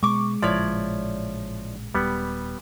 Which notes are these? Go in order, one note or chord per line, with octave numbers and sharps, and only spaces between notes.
B2 G#3 B3 C#6 D6
A1 A#2 C#3 F3 E4 C#5 D5
D#1 G3 B3